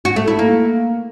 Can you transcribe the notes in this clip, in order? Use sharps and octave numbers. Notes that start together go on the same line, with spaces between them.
F#4
A3
E4
A#3